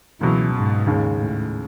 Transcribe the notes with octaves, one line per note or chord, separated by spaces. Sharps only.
C#2 B2 E3 F#3
G#2
D#2 C#3 G#3
A2